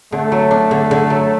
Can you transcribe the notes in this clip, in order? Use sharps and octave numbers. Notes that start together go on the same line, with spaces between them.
D3 A3
F#3
D4
D3
D3
F#3